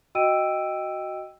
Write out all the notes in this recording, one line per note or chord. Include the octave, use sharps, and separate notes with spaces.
F#4 D#5 G5 E6 D7 D#7